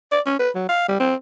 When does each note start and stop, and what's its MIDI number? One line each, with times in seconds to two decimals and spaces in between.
0.12 0.21 74
0.26 0.36 61
0.40 0.50 71
0.55 0.67 54
0.69 0.86 77
0.89 0.96 55
1.00 1.15 60